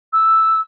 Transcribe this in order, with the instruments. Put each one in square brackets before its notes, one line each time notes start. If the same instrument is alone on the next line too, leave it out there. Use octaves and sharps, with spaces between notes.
[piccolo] E6